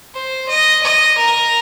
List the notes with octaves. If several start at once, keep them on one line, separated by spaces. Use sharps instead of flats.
C5
D#5
D#5
A#4